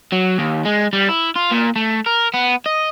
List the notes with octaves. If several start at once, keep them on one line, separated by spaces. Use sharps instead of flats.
F#3
D#2
G#3
G3
E4
F4
A#2
A3
A#4
B3
D#5